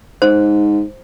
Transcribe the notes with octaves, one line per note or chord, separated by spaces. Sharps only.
G#2 C5